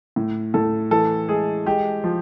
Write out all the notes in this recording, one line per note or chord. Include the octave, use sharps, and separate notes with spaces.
A2
A2 A4
E3 A4
G#3 G#4
G#3 G4
F3